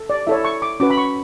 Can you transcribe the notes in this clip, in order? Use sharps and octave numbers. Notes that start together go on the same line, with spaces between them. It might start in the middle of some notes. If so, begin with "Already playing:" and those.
Already playing: A4
D5
E4 A4 C#5 E5
C#6
D6
C#4 F#4 B4 D6
B5
C#6